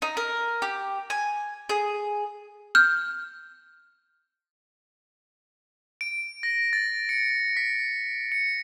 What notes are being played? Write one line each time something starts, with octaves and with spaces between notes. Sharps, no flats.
D#4
A#4
G4
G#5
G#4
F6 G6
D7
A#6
A6
C#7
C#7
B6
C#7